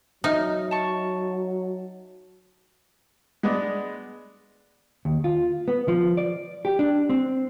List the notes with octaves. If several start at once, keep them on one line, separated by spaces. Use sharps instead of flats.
F#3 D#4 D#5 E5 F6
A5 C#6
G#3 B3 D4
D#2
F4
B3
F3
D5
G4
D4
C4